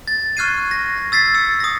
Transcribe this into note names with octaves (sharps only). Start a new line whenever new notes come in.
A6
C#6 F6 F#6 G#6 C7 D#7
A#6
E6 A6 B6 C7
E6 C#7
D#6 A#6